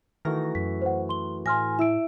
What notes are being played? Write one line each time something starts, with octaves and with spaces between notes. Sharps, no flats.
D#3 E3 A3 F#4 A#4 A#6
F#2 B6
C5 F#5
C6 G7
A2 G#5 C6 F6 A#6
E4 E5 E6 D7